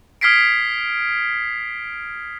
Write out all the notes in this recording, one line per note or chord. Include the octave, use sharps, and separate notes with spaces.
D#6 F6 G#6 B6 C7 D7